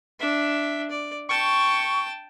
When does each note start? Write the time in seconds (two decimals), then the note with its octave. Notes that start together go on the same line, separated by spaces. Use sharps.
0.20 D4 E5
0.90 D5
1.29 G5 A5 C#6